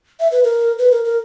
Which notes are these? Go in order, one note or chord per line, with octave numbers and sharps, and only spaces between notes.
E5
B4
A#4
B4
A#4
A#4